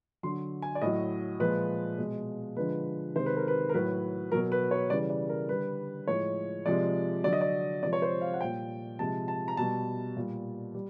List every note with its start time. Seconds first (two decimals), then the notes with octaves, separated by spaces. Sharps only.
0.23 D3 F#3 C6
0.62 G#5
0.75 D5
0.82 A2 F#3 D#5
1.40 A#2 F3 G#3 B4
1.98 B2 G#3
2.57 D3 F3 G#3 B4
3.15 C3 D#3 G#3 C5
3.26 B4
3.37 A#4
3.48 B4
3.69 A#4
3.74 A2 F#3 B4
4.32 B2 F#3 A#4
4.52 B4
4.71 C#5
4.90 C#3 E3 G3 D5
5.10 D5
5.29 A#4
5.49 D3 G3 B4
6.07 A2 F3 G#3 C#5
6.66 C3 F3 G#3 D5
7.24 D3 F#3 D5
7.33 D#5
7.41 D5
7.82 C3 F3 G#3 D5
7.93 C#5
8.02 C5
8.21 F5
8.34 F#5
8.41 A#2 G3 G5
8.99 C3 F3 G#3 A5
9.28 A5
9.48 A#5
9.57 B2 G3 A5
10.16 A#2 G3
10.75 G3